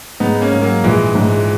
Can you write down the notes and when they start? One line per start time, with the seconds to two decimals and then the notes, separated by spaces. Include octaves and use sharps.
0.20 G#2 B3 D#4
0.41 A#3 C#4
0.52 G#2
0.62 F#3 A#3
0.84 A#1 E3 G#3
1.15 G#2